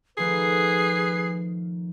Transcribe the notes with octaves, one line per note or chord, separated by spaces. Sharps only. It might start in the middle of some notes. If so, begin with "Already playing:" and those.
D#3 F3 A3 G#4 B4 C7